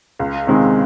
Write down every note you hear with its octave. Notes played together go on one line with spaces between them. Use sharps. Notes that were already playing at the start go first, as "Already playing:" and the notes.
C#2
C3 D#3 G#3 C4